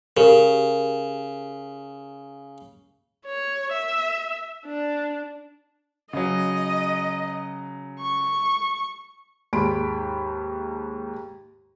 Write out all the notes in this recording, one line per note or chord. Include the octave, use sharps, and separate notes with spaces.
C#3 G4 A#4
C#5
E5
D4
C#3 F#3 D#5
C#6
D#2 G#2 B5 C6 D7